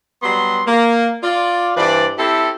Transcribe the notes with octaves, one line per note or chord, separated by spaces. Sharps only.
F#3 G3 B3 C6
A#3
F4 D5
G2 E3 B4 C5 D5
C4 E4 G4 A4